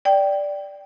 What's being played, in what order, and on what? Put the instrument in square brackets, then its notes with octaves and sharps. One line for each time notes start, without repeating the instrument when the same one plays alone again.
[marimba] D5 G5